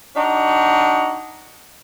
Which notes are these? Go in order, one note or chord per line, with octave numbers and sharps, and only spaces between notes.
D4 D#4 F#4